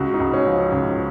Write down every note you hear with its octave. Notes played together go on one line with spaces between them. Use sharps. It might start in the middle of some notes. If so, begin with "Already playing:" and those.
Already playing: C#2 F#4
D#4
C#2
C#4
F3
C#2